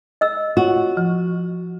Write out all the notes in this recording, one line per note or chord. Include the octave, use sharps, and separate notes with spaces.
D#5 E6
F4 F#4 C#5
F3